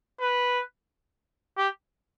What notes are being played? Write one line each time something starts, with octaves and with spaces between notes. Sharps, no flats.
B4
G4